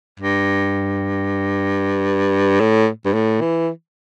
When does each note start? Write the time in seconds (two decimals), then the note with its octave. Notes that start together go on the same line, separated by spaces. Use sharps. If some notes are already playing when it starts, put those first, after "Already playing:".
0.20 G2
2.60 A2
3.05 G2
3.14 A2
3.41 E3